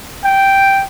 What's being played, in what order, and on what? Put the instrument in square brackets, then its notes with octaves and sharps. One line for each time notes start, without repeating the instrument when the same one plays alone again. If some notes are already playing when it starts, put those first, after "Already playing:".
[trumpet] G5